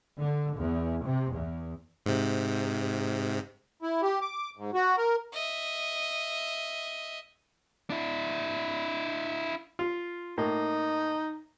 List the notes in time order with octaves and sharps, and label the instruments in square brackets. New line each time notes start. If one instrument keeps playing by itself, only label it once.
[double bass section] D3
E2
C3
E2
[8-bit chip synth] G#2 C3
[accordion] E4
G4
D6
G#2
F#4
A#4
[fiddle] D#5 E5
[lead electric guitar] D4 E4
[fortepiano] F4
[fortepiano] A2 A#3 [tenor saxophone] D#4